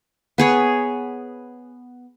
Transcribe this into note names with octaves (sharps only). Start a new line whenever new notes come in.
B3 G#4 C#5